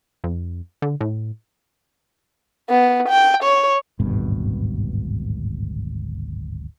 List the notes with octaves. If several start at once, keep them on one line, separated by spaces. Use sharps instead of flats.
F2
D3
A2
B3
G5
C#5
D1 G#1 G2 B2